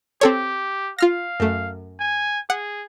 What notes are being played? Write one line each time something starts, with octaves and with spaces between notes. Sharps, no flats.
C4 G4 A4 C#5
F4 F5 F6 A#6
F#2 A3
G#5
G#4 F#5